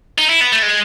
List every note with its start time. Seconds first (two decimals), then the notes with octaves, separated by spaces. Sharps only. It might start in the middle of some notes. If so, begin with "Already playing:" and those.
0.18 D#4
0.29 E4
0.41 B3
0.52 A3
0.62 G#3